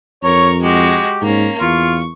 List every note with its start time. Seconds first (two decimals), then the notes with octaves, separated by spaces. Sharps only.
0.23 F2 A#4 C#5 C#6
0.62 G#3 F#4 G4
1.22 G#2 A#3 C#4
1.60 E2 F4 C#6